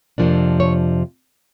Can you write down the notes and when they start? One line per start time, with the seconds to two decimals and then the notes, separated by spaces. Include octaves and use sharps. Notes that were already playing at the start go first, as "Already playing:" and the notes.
0.18 F2 C3 F3 A#3 D4
0.60 C#5